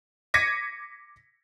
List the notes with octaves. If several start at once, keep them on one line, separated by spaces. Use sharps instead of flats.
D6 G#6 A#6 B6 C#7 D#7